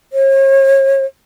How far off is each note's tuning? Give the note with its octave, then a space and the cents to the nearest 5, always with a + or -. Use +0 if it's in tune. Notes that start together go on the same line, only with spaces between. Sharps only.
C#5 -40